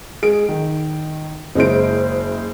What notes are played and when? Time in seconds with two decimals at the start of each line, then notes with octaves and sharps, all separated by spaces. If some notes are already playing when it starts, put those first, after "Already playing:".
0.22 G#3 G#4 D7
0.49 D#3
1.55 F#1 G#3 E4 C5 D7